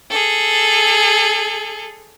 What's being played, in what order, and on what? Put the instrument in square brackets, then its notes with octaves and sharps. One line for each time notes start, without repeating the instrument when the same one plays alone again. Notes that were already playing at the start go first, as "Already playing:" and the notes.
[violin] G#4 A4